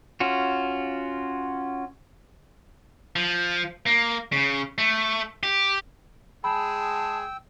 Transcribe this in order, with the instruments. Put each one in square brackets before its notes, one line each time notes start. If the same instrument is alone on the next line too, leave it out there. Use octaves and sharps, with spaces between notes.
[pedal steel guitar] C#4 F4 F#4
[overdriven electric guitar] F3
A#3
C#3
A3
G4
[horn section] G#3 G#4 [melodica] G5 E6 [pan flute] A5 [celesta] B5